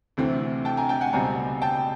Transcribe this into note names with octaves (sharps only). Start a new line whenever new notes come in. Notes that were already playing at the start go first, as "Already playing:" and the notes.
D2 C3 E3 A3 C4
G5 A5
G#5 A#5
G5 A5
F#5 G#5
C#2 B2 G3 C4 G#5 A#5
G5 A5